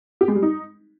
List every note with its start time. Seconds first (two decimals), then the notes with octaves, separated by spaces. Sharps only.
0.21 G4
0.28 G#3
0.35 G3
0.42 D#4